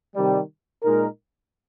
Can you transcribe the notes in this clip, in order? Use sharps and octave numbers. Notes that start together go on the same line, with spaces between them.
C3 D#3 G3
A#2 G#3 D#4 A#4